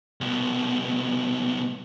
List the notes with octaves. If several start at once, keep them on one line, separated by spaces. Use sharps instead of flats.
C2 B2